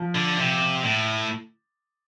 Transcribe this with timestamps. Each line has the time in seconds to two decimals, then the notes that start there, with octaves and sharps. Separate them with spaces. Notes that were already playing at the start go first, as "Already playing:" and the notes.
Already playing: F3
0.15 D3
0.38 C3
0.84 A2